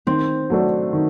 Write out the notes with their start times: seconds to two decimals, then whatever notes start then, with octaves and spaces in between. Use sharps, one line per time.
0.07 D#3 C4
0.50 F#3 A3 D4
0.93 D#3